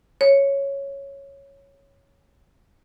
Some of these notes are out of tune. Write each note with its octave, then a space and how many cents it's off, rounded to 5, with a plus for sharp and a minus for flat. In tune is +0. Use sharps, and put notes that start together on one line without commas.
C#5 +0